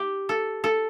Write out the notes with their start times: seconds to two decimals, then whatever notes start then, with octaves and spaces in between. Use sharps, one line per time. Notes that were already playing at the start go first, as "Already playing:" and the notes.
Already playing: G4
0.29 A4
0.64 A4